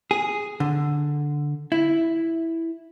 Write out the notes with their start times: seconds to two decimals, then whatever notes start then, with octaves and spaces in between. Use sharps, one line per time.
0.11 G#4
0.60 D3
1.72 E4